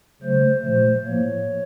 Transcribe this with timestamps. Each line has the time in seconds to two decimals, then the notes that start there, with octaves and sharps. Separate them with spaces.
0.22 C#3 F#3 A3 C5
0.64 A#2 F3 A3 C5
1.05 A2 F3 A#3 C#5